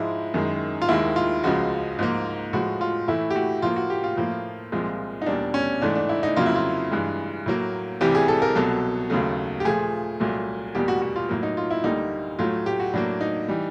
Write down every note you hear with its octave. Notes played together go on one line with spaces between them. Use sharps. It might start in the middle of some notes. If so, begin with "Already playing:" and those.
Already playing: G#2 F3 G#3 E4
F#2 D#3 G#3
F4
D#2 D#3 G#3 E4
F4
C#2 C#3 F3 G#3 F#4
G#2 F3 A#3
A2 F3 G#3 F#4
F4
A2 E3 A3 E4
G4
F#4
A2 F3 A#3 F4
F#4
G4
F4
A2 F3 A#3
C2 A#2 F3 G#3
D#4
E2 B2 G3 A#3 D4
C#4
G#2 E3 A3 D4
D4
E4
D#4
F2 C#3 F#3 A#3 F4
E4
F4
G2 E3 G#3
A2 F#3 A#3
C2 C3 E3 G3 G4
G#4
A4
A#4
C2 B2 F#3 A4
D#2 C#3 F#3 A3
G4
A#2 F3 A3 G#4
C2 A#2 F#3 A3
E2 B2 G3 A#3 G4
F#4
F#4
F4
A2 F#3 A#3
D#4
F4
E4
D2 D3 G3 A#3 D#4
A2 F#3 A3 F4
G4
F#4
A2 F#3 A#3 D4
D#4
E3 G3